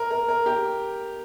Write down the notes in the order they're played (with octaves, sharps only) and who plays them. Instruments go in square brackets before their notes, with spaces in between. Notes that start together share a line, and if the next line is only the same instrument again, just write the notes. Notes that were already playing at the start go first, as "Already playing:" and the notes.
Already playing: [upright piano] A#4
A#4
A#4
G4